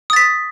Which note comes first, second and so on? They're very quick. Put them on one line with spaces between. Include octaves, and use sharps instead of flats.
D#6 A6 B6